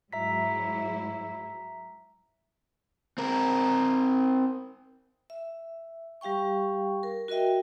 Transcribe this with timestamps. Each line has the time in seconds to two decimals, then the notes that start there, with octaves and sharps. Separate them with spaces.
0.13 G#2 F#3 E4 E5 A#5 B6
3.18 C4 A#4
5.30 E5
6.21 G3 G4 F5 G5 C#6
7.03 A#4
7.28 F#4 A#4 D#5 E5 G5